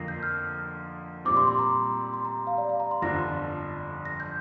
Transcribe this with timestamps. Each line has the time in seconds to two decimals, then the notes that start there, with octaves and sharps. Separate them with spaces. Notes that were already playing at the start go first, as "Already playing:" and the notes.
Already playing: F2 D3 A#3 F4 A#6 C7
0.08 G6
0.23 F6
1.25 A#2 G3 C4 D6
1.37 C6
1.47 C6
1.59 A#5
2.13 C6
2.25 A#5
2.47 F5
2.58 D5
2.69 F5
2.80 A#5
2.91 C6
3.02 G1 F2 D3 F3 D4 A#6
4.05 A#6
4.20 G6